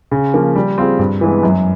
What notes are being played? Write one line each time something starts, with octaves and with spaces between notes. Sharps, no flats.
C#3
F3 A#3
G3
C4 F4 G#4
G2
E3 G#3 B3
F#2